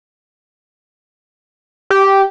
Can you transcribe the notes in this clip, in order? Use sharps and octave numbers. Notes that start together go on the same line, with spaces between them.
G4